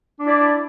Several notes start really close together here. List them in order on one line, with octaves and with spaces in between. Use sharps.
D4 E4 D5